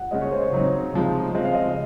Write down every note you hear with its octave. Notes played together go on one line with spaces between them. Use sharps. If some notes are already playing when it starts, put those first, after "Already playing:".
Already playing: F#5
C#3 G#3 C#4 D#5
C#5
C5
C#5
C#3 F#3 C4 D#4
C3 F3 G#3 D#4
C#3 F3 G#3 C4 D#5
F5
D#5